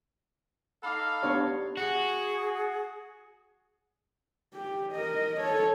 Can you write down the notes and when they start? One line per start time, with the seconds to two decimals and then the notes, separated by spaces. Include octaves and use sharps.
0.83 D#4 A4 F5 B5 D6 F6
1.23 B3 D4 G4 C#5
1.77 F#4 G#4
4.53 G4
4.92 A#4 D#5
5.40 A4 C#5